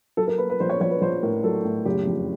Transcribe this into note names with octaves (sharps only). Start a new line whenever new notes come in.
F#3 A4
A#4
A#3 B4
B4
A#1 C5
C#5
A#1 C#5
B4
A#1 C5
A2 A#4
F#3 A4
A2
F#1 G4
F2